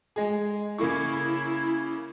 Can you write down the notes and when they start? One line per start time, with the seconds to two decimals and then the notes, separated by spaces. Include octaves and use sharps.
0.16 G#3 G#4
0.78 C#3 A#3 E4 C#6